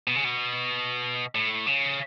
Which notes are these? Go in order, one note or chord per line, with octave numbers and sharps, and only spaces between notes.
B2
C#3
B2
A2
C#3